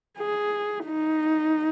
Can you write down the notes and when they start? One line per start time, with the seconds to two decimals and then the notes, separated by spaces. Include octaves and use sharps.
0.19 G#4
0.86 D#4